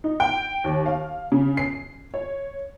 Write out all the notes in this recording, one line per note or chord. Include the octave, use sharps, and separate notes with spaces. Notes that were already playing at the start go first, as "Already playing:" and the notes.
D#4
G5
D#2
F5
C#3
C7
C#5